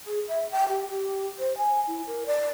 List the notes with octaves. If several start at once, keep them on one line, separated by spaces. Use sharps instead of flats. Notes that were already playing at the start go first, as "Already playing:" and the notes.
G#4
E5
G5
G4
G4
C5
G#5
E4
A#4
D5